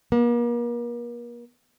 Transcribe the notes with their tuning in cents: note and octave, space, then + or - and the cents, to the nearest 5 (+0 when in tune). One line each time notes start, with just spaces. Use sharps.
A#3 +40